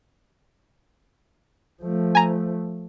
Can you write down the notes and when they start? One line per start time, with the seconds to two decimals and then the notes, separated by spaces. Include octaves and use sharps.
1.82 F3 A3
2.15 G#5 A#5